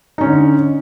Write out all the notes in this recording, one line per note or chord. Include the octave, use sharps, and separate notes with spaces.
D3 C#4 D#4